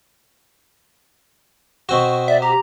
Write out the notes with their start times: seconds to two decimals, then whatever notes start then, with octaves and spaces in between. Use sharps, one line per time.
1.89 B2 C4 F#4 C#6
2.28 D5 E5
2.42 G4 A#5